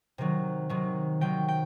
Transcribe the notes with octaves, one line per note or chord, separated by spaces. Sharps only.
C3 D#3 F#3
C3 D#3 F#3
C3 D#3 F#3 G5
G5